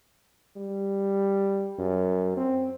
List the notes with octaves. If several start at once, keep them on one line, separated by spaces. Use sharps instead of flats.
G3
F#2
C4